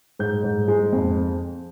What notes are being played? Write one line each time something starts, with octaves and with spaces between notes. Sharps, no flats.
G#2 G6
G#2
G#3
F2